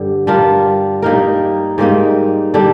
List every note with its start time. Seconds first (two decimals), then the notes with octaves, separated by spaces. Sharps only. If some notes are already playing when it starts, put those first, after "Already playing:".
Already playing: G2 D3 G3
0.27 G3 D4 F4 A#4
1.02 G3 A#3 D#4 A#4
1.78 G#2 G3 A#3 D#4
2.54 D3 G3 D4